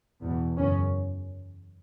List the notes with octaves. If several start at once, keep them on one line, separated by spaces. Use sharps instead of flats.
E2 B2 B3
F#2 C#3 C#4